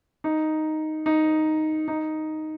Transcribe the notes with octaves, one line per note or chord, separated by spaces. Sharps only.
D#4
D#4
D#4